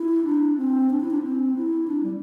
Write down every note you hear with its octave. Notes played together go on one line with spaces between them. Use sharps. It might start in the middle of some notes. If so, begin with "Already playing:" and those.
Already playing: E4
D4
C4
D4
E4
D4
C4
E4
D4
G3